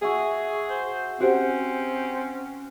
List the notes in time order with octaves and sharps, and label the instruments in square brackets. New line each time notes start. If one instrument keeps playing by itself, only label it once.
[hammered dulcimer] F#4 E5 G#5 [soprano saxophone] G#4
[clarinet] C5
[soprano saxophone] C4 [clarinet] C#4 [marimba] F#4 G4 C5 [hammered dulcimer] F#5